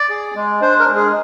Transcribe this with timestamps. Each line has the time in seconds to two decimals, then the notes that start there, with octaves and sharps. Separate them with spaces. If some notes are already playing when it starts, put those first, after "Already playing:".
Already playing: D5
0.09 G#4
0.35 G#3
0.61 D4 C5
0.79 A#4
0.88 G#3
0.96 G#4